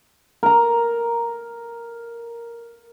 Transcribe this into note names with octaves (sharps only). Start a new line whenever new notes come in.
A#4 A#5